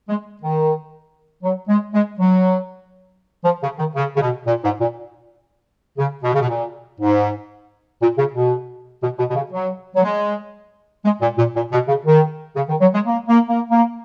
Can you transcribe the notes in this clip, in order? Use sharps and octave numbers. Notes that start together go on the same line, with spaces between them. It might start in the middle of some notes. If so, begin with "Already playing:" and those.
G#3
D#3
F#3
G#3
G#3
F#3
F3
C#3
D#3
C#3
C#3
B2
A#2
G#2
A#2
C#3
B2
C#3
B2
A#2
G#2
A#2
C#3
B2
B2
B2
B2
C#3
F#3
F#3
G#3
G#3
A#2
A#2
A#2
B2
C#3
D#3
C#3
D#3
F#3
G#3
A#3
A#3
A#3
A#3